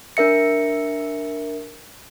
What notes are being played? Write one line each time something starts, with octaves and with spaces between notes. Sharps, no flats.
D4 A#4 E5 C#7